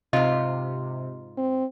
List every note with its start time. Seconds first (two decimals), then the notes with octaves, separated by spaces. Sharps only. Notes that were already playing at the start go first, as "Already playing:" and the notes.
0.13 G#2 C3 F4 D#5
1.37 C4